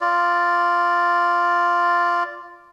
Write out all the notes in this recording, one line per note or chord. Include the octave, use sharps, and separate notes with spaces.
F4 D5